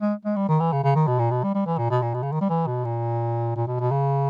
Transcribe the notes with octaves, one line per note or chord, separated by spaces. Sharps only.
G#3
G#3
G3
D#3
E3
C#3
C#3
D#3
B2
A#2
B2
G3
G3
E3
A#2
B2
A#2
B2
C#3
D#3
G3
E3
B2
A#2
A#2
B2
B2
C#3